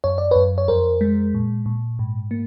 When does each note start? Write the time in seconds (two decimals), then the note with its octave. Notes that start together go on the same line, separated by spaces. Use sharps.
0.04 F#2 C#5
0.18 D5
0.31 F#2 B4 C#5
0.58 C#5
0.68 F2 A#4 C5
1.01 G#3
1.34 A#2
1.66 A#2
1.99 G#2
2.31 A#3